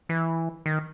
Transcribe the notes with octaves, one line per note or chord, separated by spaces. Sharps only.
E3
D#3